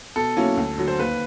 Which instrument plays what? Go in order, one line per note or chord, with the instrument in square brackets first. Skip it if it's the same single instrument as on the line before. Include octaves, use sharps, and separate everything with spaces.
[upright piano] B2 [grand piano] A4
[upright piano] F#3 A#3 C#4 E4
D2
D3 F#3
[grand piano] C5
[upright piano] D#2 [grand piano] B4